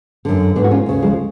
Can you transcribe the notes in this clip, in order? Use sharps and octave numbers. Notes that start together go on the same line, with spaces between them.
F#2 D3
G#2 B3 D4
F#4
C#4 F4
D2 C#3
F3 G#3